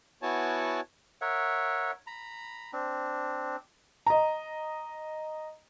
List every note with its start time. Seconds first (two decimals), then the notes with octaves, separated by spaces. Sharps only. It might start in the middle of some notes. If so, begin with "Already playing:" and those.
0.22 B3 E4 F#4 C#5 G#5 A5
1.21 A#4 C#5 E5 F#5
2.07 A#5 B5
2.73 C4 D4
4.06 D#5 A#5